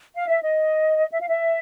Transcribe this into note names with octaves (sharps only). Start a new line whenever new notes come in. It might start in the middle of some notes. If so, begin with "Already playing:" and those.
F5
E5
D#5
E5
F5
E5